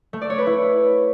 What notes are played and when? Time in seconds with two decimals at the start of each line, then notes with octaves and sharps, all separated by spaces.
0.13 A3
0.22 D5
0.30 C#5
0.38 B4
0.47 E4